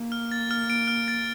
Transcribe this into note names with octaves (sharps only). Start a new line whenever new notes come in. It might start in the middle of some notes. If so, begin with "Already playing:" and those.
Already playing: A#3
F6
A6
F6
D7
F6
A6